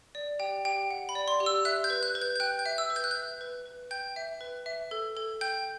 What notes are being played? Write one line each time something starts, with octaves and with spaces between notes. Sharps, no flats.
D5
G4 G5
G4 G5
F#5
B5
D5
C6
G4
E6
E5 F#6
G6
B4
F#6
B4
G6
G6
G5 F#6
G6
E5
E6
B4
G6
F#6
E5 G6
B4
B4
G5 G6
E5
B4
E5
A4
A4
G5 G6